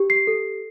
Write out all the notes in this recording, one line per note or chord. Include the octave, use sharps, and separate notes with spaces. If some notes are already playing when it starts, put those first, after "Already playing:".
Already playing: G4
C7
A4